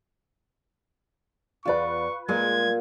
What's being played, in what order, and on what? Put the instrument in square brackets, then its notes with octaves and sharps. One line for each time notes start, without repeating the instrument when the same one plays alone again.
[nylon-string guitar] E2 D5 [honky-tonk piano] F4 B4 [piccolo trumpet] C#6
[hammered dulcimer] A#2 [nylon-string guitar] G#3 [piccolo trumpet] G#6